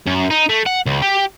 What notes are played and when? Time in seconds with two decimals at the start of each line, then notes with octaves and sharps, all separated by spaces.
0.07 F#2
0.31 D#4
0.49 A3
0.66 F#5
0.86 C#2
1.02 G4